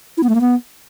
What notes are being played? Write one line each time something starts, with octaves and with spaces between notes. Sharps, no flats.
E4
B3
A3
A#3
B3